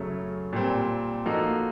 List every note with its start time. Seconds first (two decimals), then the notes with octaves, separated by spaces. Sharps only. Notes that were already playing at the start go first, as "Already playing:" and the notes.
Already playing: F#2 C#3 F#3 A3
0.53 A#2 G3 C4
1.26 F3 A#3 D#4 F#4 A4